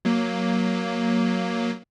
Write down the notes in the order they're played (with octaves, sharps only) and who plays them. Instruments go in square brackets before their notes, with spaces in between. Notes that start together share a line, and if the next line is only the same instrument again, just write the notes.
[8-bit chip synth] F#3 A#3